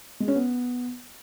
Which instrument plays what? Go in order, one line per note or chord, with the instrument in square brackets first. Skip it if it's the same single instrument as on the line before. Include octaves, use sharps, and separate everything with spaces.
[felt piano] G#3
C#4
B3